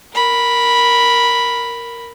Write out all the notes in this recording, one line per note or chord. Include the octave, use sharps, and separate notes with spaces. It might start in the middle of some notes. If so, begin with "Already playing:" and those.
A#4 B5